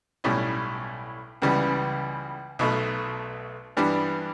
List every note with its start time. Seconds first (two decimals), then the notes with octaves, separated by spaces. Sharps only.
0.24 B1 A2 G3 C#4
1.42 C#2 C#3 E3 G3 B3
2.59 B1 B2 A3
3.77 G2 E3 G3 B3 D4